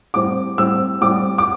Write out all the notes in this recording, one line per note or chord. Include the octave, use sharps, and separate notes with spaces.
A2 G3 C4 D6
A2 G3 C4 E6
A2 G3 C4 D6
D6